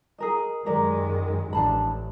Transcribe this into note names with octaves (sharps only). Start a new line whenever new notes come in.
G#4 A#4 D#5
F#2 D#3 G#3 G4 A#4 D5
A1 D4 A5 B5